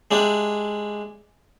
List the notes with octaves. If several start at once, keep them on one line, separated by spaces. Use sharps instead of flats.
G#3 D4 E4 G4